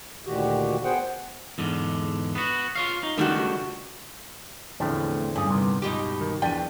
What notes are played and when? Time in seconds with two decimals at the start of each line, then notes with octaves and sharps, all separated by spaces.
0.27 D2 A#2 D#3 F#4 G4
0.84 B3 G#4 C5 F#5 G5
1.58 E2 G#2 D3
2.35 B3 F#4
2.75 F4 C#5 F5
3.03 D#4
3.17 C#2 D#3 G3 A3 D4 F#4
4.80 E2 A2 D3 F3 A3 C4
5.36 G2 C#4 G#4
5.50 C3 D#3 B3
5.82 C#2 G2 B2 D#4 F4 G4
6.21 D#3
6.42 E2 F3 D4 D5 E5 G5 D#7